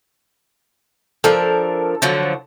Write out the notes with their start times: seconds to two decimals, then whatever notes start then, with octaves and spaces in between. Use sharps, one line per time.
1.24 F3 D4 A4 A#4
2.02 D3 F3 F#3